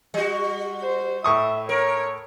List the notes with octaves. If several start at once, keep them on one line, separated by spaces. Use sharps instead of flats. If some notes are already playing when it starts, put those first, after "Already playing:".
G3 F#4
C5
A2 E5 C#6 D#6
A#4 C#5